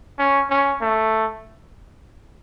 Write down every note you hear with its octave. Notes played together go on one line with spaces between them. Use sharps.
C#4
C#4
A3